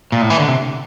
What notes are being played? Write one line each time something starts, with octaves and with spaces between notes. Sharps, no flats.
A#2
A2
E3
D3
C3